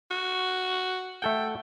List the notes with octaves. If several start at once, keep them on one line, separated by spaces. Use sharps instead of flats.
F#4
A3 A4 F#5 G5